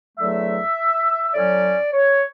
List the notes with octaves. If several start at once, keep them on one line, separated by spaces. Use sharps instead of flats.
E2 D3 F#3 A3 E5
A2 F#3 C#4 D5
C#5